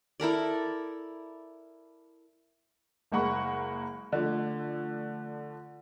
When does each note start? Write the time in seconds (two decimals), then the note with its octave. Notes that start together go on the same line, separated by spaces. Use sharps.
0.20 E4 A4 A#4 D5
3.12 F#1 G#3 A#3 F#5 B5 C#6
4.12 D3 F3 A3